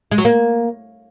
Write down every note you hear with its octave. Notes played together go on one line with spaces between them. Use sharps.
G#3
F#3
A#3